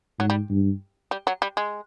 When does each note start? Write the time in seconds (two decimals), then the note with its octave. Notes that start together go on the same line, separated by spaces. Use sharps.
0.19 G#2 F#3
0.30 G3
0.50 G2
1.11 G3
1.27 F#3
1.42 G3
1.57 G#3